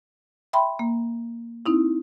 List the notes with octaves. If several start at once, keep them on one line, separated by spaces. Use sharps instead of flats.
E5 G5 B5 C6
A#3
C4 D#4 E4